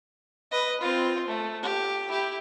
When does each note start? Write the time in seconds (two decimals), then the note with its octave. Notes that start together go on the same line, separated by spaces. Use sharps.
0.51 B4 D#5
0.81 C4 F4
1.28 A3
1.62 G4
2.09 E4 G4